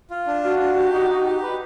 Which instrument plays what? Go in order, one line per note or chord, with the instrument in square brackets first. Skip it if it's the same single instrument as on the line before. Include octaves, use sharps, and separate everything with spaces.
[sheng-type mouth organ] F4
D4
[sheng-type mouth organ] F4 [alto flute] F#4
[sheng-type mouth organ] D4
G4
D#4
D#4
G4
B4